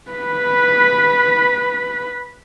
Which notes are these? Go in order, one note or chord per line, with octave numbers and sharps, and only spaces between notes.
B4 B5